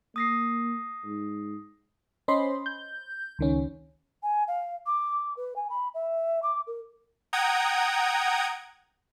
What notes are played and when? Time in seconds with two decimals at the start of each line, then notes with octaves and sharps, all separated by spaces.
0.16 A#3 D#6 A#6 C7
1.05 G#2
2.28 C#4 C5 D#5 B5 C6
2.66 G6
3.39 C#2 D#3 C#4
4.23 G#5
4.48 F5
4.86 D6
5.37 B4
5.56 G#5
5.70 B5
5.94 E5
6.43 D6
6.67 A#4
7.33 F#5 G5 A#5 D#6 G#6